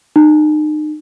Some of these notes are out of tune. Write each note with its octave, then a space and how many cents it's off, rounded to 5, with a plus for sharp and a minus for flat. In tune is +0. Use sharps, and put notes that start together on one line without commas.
D#4 -35